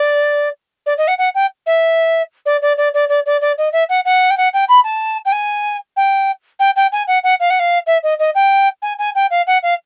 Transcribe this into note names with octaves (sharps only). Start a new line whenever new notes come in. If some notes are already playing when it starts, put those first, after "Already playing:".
Already playing: D5
D5
D#5
F#5
F#5
G5
E5
D5
D5
D5
D5
D5
D5
D5
D#5
E5
F#5
F#5
G5
F#5
G5
B5
A5
G5
G#5
G5
G5
G5
G#5
F#5
F#5
F5
F#5
F5
E5
D#5
D#5
G5
G#5
G#5
G5
F5
F#5
F5